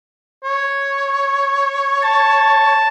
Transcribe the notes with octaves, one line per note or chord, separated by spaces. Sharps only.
C#5
A5